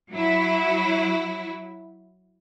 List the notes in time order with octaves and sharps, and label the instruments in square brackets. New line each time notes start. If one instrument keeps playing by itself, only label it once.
[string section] F#3 E4